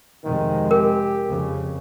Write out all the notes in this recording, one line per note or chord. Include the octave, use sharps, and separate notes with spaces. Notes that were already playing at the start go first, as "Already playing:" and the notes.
F2 C3 D#3 G#3
G4 A#4
F2 C#3